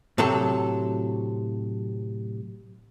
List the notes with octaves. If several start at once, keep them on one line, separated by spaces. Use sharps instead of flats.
A2 C3 F#3 A4